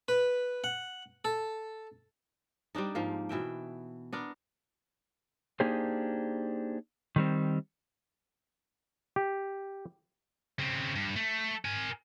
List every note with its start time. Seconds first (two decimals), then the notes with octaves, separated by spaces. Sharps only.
0.08 B4
0.64 F#5
1.25 A4
2.75 G3 C4 D4 D#4
2.95 G#2 F3 A#3
3.29 B2 E3 E5 G5
4.13 B3 D4 A#4
5.60 A#3 D4 D#4 G4 G#4 C5
7.16 D#3 G3 C4
9.16 G4
10.59 C#3 C4
10.96 G2
11.16 A3
11.65 A#4 G#5